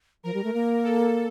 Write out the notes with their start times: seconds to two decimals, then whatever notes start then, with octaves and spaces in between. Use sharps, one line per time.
0.24 F3 A#4
0.34 G3
0.44 A3
0.54 A#3
0.84 A4